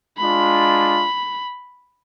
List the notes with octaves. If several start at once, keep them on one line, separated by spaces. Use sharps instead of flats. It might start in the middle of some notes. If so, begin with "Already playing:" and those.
G#3 D4 F4 B5